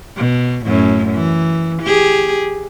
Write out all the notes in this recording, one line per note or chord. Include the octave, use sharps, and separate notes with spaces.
B2
F#2 A2
E3
G4 G#4